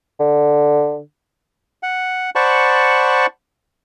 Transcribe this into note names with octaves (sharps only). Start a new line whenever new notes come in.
D3
F#5
C5 D5 F#5 A5 B5 C#6